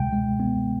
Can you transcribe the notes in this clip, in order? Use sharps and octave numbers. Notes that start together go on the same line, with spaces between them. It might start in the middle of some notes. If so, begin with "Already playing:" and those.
Already playing: C#2 B2 G#3 G5
G#3
B3